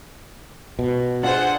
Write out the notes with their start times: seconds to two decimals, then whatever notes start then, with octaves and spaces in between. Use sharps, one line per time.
0.79 B2
1.23 D4 F4 G#4 A4 C5 F#5